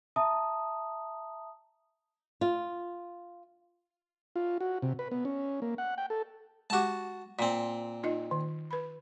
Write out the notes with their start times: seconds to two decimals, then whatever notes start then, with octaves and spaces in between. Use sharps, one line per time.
0.16 E5 A5 A#5 D#6
2.41 F4
4.36 F4
4.61 F#4
4.82 C3
4.99 B4
5.11 B3
5.25 C#4
5.62 A#3
5.78 F#5
5.98 G5
6.10 A4
6.70 G#3 F#4 G4 A5 D6
7.39 A#2 C4 D5 G#5
8.04 D#4 F4 D#5
8.31 D#3
8.71 B4 B5